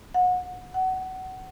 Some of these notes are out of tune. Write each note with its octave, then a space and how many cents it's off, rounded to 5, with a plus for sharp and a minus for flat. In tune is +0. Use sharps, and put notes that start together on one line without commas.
F#5 -30
F#5 +20